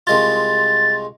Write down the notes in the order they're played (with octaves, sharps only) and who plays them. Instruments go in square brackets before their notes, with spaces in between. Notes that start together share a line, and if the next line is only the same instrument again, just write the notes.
[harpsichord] C2 G#3 F4 [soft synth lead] A6